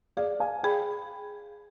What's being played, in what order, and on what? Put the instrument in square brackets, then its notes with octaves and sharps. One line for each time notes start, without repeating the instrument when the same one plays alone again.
[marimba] G#4 [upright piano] D5 F5
[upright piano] F5 G#5
[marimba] G#4 [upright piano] G5 B5